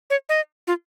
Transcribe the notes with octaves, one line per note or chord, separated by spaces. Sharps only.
C#5
D#5
F4